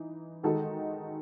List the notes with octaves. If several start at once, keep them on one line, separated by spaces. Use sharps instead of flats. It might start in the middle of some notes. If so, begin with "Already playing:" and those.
Already playing: E3 D#4
D#3 G#3 D#4 F#4 A4